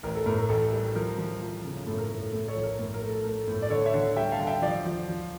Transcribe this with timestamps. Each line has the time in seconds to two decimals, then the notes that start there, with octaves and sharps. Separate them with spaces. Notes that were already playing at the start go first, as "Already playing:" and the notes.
0.03 A1 A#4
0.15 A4
0.26 A2 A#4
0.38 A#4
0.49 A1 A4
0.73 G3
0.95 F3 A#4
1.18 F3
1.41 F3
1.64 C#3
1.87 A2 A4
1.98 A#4
2.10 A2 A#4
2.21 A4
2.32 A2 A4
2.48 A4 C#5
2.56 A#1
2.63 A#4
2.79 A2 A#4
2.94 A#4
3.01 A3
3.09 A4
3.24 A3 A#4
3.48 A2
3.62 D5
3.70 D3 A4 C#5
3.86 C#5 E5
3.94 D3
4.16 G3 E5 G5
4.32 F5 A5
4.39 D3
4.47 E5 G5
4.62 F3 D5 F5
4.85 F3
5.08 F3